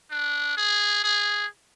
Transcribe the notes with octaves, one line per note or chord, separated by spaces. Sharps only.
D4
G#4
G#4